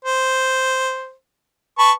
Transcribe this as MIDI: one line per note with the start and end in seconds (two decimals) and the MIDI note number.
0.05 1.12 72
1.79 1.92 71
1.79 1.92 81
1.79 1.92 85